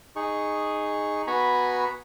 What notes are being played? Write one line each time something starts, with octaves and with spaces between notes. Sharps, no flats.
D#4 G#4 C#6
B3 F#4 G#5 A#5 B5 C#6